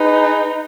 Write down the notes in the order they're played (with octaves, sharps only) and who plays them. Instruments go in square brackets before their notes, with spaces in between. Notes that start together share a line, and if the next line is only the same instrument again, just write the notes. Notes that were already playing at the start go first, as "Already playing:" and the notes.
Already playing: [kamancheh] D#4 [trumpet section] G#4 B4